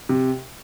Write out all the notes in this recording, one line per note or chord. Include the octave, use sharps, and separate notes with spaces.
C3